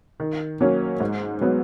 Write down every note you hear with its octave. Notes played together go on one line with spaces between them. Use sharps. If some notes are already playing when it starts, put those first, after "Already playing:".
D#3
F#3 A#3 C#4
G#2
F#3 B3